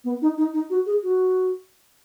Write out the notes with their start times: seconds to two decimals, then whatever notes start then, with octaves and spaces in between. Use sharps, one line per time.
0.04 B3
0.22 D#4
0.37 D#4
0.53 D#4
0.70 F#4
0.86 G#4
1.03 F#4